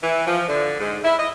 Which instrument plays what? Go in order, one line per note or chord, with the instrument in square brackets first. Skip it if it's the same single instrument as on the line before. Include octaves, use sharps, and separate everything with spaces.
[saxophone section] E3
F3
D3
G#2
E4
D#5